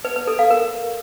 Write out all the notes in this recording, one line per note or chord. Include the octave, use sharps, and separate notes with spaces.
B4
B4
A4
F5
A#4